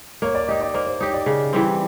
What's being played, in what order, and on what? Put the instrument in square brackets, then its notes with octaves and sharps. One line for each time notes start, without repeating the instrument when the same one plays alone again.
[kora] A#3 [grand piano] C#5
[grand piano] D5
[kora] D#4 G4 [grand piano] D#5
[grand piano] D5
[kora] A#3 [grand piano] C5
[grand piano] C5
[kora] D#4 G4 [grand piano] C#5
[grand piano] D5
[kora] C#3
E3 G3 C4